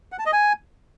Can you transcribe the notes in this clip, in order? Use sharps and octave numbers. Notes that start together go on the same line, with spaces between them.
F#5
A5
D#5
G#5